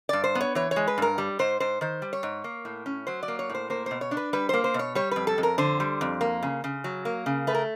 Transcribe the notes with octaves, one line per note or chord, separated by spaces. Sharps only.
G2 D5
C5
B3
C#5
E3 C#5
C#5
G#3
B4
G2 A#4
G3
G#2 C5
G#2 C5
D#3 C5
G3
C#5
G#2
A#3
A2
C#4
F#3 C5
D5
A#3
C#5
A2 C5
A#3 C5
B2 C5
C#5
D4
B4
G3 B4
A#3 C5
C5
B2 C#5
G3 C#5
F2 B4
A4
F2
A#4
D3 C5
G3
F2
A#3
C#3
C#3
F#3
A#3
C#3
A3 B4
A#4